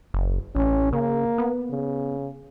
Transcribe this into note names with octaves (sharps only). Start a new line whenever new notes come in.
F#1
A1 C#4
C#3 A#3
B3
C#3